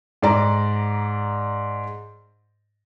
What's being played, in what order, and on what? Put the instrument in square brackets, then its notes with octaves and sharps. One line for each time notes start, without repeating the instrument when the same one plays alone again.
[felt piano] G#2 D5 A#5